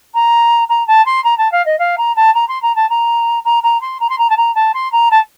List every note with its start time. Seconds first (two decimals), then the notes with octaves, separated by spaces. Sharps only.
0.14 A#5
0.69 A#5
0.87 A5
1.06 C6
1.24 A#5
1.38 A5
1.52 F5
1.65 D#5
1.79 F5
1.97 A#5
2.16 A5
2.34 A#5
2.48 C6
2.62 A#5
2.75 A5
2.89 A#5
3.45 A#5
3.63 A#5
3.81 C6
4.00 A#5
4.09 C6
4.18 A#5
4.30 A5
4.37 A#5
4.55 A5
4.74 C6
4.92 A#5
5.11 A5